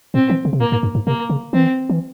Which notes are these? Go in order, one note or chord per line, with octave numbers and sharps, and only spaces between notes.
A#2 C4
E3
C#3
C3
A#2 A#3
G#2
G2
G#2
C3 A#3
C#3
E3 C4
E3